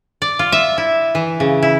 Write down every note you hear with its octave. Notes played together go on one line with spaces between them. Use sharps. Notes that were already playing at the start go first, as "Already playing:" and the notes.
D5
F4
E5
E4
E3
C#3
E4